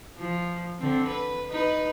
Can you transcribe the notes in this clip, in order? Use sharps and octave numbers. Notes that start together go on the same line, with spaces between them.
F3
D3 C4
B4
D#4 B4